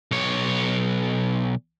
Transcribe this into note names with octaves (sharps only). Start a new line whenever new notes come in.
B1 C#5